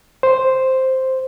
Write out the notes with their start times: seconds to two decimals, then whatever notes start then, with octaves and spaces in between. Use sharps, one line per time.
0.23 C5